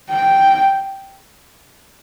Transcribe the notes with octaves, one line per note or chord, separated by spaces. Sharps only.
G5